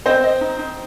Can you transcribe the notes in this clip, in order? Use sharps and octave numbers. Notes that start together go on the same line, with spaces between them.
C4 C5 D#5
D#5
D#4
D#4